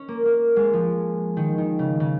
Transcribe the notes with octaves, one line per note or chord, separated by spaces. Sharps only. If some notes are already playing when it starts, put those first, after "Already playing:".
Already playing: C#4
A#3
A#3
G#3
F3
D#3
D#3
C#3
C#3